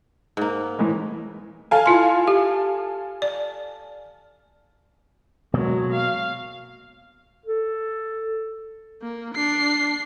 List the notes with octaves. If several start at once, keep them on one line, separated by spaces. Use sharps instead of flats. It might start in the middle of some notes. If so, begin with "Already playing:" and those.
G#2 A#3
A2 E3 G#3
A4 F5 G#5
E4 F4 C6
G4
D5
B2 F#3 G#3 A#3
F5
A4
A#3
D4 C7